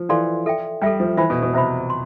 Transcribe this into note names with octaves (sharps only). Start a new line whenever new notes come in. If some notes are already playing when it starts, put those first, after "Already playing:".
Already playing: F3
E3 A4 D5 F5 C6
A4 E5 G5
G3 A4 E5 G5
F3
E3 C5 E5 B5
B2
B2
C3 C5 E5 B5
C6